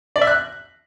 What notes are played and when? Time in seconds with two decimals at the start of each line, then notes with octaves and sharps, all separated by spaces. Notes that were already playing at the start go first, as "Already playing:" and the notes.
0.16 D5
0.21 E5
0.27 F#6